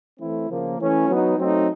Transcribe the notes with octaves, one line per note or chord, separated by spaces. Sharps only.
E3 A3 C4 E4
C#3 F3 A#3
E3 A3 C#4 E4
F#3 B3 D#4
F#3 A3 C4 D#4